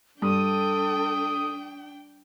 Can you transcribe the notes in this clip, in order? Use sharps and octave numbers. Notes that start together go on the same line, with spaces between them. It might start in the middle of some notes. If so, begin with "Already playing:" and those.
G2 D4 A4 G5 D#6